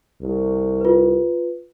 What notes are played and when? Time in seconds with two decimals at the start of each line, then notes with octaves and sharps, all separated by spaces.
0.22 C2
0.81 F4 B4